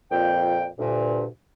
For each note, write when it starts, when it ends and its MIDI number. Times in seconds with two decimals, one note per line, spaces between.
0.12 0.66 41
0.12 0.66 46
0.12 0.66 79
0.79 1.25 38
0.79 1.25 43
0.79 1.25 46